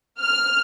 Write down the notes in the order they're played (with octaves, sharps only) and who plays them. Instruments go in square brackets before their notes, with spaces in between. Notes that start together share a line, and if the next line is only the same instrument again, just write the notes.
[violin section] F6